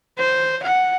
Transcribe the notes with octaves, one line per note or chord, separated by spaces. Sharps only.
C5
F#5